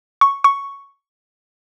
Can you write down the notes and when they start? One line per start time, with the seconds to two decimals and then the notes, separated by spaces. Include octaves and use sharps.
0.21 C#6
0.44 C#6